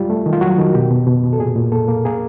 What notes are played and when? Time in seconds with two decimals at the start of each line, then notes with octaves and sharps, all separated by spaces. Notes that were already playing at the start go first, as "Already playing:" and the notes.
Already playing: G3 F4
0.10 A3
0.26 D#3
0.33 F4
0.41 F#3 F#4
0.58 D#3
0.74 B2 G4
0.91 B2
1.07 B2
1.24 B2
1.33 A4
1.39 A#2 G#4
1.56 A#2
1.72 A#3 A4
1.88 A#3
2.05 A#3 G#4